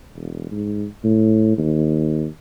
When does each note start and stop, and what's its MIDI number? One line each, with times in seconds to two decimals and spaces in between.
0.15 0.49 28
0.51 0.86 44
1.04 1.55 45
1.58 2.26 39